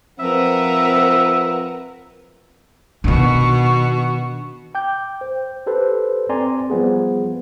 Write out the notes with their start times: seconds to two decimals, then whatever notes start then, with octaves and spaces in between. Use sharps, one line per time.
0.20 F3 C4 A#4 B4 E5 F#5
3.04 B2 D#3 D4 F#4
4.75 G5 D6 G6
5.21 C5
5.66 G4 A4 B4 C5
6.29 C4 D5 G#5 A#5 C6
6.70 F3 G3 B3 G#4